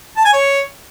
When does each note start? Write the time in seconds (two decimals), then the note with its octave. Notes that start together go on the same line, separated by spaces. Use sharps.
0.17 A5
0.25 G#5
0.33 C#5